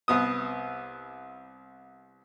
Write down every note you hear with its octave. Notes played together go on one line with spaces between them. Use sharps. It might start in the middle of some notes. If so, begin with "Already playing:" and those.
C2 B3 D#6